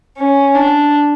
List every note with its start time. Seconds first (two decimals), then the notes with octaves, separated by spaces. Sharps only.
0.17 C#4
0.55 D4